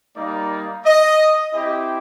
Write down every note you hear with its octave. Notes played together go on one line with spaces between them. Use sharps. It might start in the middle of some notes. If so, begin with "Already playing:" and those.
G3 A#3 D#4 D5
D#5
C4 E4 G4 D#5